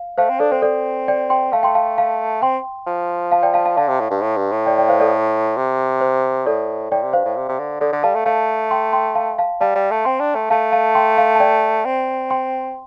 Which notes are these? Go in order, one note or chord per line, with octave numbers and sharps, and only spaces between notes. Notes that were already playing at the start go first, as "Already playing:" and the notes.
Already playing: F5
A3 C5 F5
C4
D4 A4 D5
C4 C5
C4 A4 D5
D5 G5
G5 C6
A3 F5 A5
G5 C6
F5 A5
F5 A5
C4 G5 C6
F3
F5 A5
D5 G5
F5 A5
F5 A5
D3 F5 A5
C3
A2
G2
A2
G2
A2
D5 G5
D5 G5
C5 F5
A4 D5
C3
C5
A2 A4 D5
A2 D5 G5
C3
G2 C5 F5
A2
C3
C3
D3
D3 A4 D5
D3
G3 F5 A5
A3
A3 F5 A5
G5 C6
G5 C6
F5 A5
F5 A5
G3 F5 A5
G3
A3
C4 G5 C6
D4
A3
A3 F5 A5
F5 A5
G5 C6
F5 A5
A5
D5 G5
C4
G5 C6